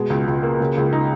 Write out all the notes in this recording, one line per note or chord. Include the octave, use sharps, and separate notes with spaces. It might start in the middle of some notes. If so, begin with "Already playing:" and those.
Already playing: B2 G#3
C#2
C#2
A#3
C#3
C#2
D#4